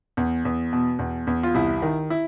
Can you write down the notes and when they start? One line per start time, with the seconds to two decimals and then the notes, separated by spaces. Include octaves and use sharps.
0.17 E2
0.45 E2
0.73 B2
0.99 E2
1.27 E2
1.43 F4
1.54 C2 E4
1.82 D#3
2.10 E4